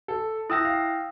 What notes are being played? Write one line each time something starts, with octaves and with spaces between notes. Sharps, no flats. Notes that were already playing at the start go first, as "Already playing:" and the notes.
A4
E4 G5 D#6 E6 A#6
F5